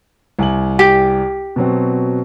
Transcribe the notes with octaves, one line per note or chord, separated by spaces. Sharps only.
C2 G#5 F#7
G4
B2 F#3 C4